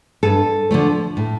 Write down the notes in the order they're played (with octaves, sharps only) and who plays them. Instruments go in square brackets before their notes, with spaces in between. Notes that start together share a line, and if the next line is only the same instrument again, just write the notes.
[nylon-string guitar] G2 A4
D3 F3 A3
A2